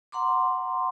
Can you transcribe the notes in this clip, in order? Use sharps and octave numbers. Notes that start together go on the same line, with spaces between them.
F#5 A#5 C6 D6